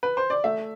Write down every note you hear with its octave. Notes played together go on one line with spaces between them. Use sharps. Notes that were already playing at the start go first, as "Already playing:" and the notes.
B4
C5
D5
A3 E5